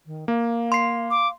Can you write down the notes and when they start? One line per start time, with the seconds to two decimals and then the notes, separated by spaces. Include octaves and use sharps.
0.06 D#3
0.28 A#3 F5
0.72 C6 C7
1.11 D6